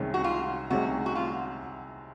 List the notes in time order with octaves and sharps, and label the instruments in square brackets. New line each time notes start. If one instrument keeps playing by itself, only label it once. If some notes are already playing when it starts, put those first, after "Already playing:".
Already playing: [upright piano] C2 C3 D#3 G#3 C#4
[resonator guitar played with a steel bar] F#4
F4
[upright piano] C2 C3 D#3 G#3 C#4 [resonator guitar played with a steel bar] F#4
[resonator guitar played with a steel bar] F#4
F4